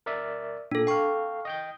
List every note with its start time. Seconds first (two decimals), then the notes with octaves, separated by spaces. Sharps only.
0.06 A#4 D5 E5
0.71 A#2 D4 A4
0.87 A4 F5 G5 C#6
1.45 D#5 G5 G6